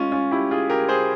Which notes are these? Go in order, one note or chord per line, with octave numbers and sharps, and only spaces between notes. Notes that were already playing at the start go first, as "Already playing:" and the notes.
Already playing: G#3 C#4 F4
C#4 F4
E4 G4
F4 G#4
G4 A#4
G#4 C5